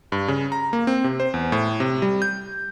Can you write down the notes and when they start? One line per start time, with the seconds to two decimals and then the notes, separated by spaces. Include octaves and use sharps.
0.12 G2
0.28 C#3
0.52 A#5
0.73 A#3
0.87 C4
1.04 C3
1.20 C5
1.34 E2
1.52 A2
1.80 C3
2.02 G3
2.22 G6